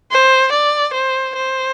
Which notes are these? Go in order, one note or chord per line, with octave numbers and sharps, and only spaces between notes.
C5
D5
C5
C5